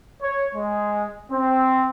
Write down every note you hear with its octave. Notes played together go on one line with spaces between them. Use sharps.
C#5
G#3
C4